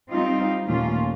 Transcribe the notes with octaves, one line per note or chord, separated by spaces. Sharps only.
G3 C4 D#4 F4
D#2 A#2 A3 C#4 F4